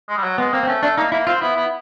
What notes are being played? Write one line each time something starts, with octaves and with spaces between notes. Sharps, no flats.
G#3
G3
F#3
G#3 B3
A#3 C4
C4
A3 C#4
A3 D4
A#3 D#4
A#3 E4
C4 F4
B3 E4
B3